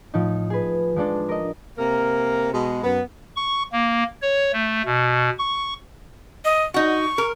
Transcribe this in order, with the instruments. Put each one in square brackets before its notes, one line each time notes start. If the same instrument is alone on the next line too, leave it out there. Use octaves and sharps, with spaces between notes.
[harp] A2 F3 D#4
G#4 B4
F3 G#3 D4 A4
A#4 D#5
[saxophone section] C3 A#3 A#4
B2 G#3
F#2 B3
[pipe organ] C#6
A#3
C#5
A3
B2
C#6
[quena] D#5
[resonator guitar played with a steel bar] D#4 F#4 [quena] C#6
[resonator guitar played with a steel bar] A#4